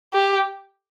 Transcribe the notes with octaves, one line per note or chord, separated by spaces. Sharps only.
G4